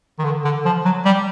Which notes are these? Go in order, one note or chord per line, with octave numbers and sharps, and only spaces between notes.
D#3
D3
D3
F3
F#3
G3